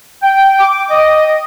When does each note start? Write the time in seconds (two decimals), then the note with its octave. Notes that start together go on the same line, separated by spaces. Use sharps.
0.23 G5
0.60 D6
0.91 D#5